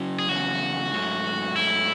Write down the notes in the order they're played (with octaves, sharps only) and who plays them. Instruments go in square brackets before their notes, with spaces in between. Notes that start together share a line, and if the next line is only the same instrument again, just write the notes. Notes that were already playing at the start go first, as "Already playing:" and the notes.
Already playing: [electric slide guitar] C#3 F#3
[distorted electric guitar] G#4
[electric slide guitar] E2 C#3 F#3 [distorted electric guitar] F#4
[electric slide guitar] G#2 F#3 A3
[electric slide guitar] G#2 F#3 A3 [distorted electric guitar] E4